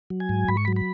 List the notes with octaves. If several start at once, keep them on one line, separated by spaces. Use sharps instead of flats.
F#3
G#5
G#2
G#2 B5
C#6
B5
F#3
B5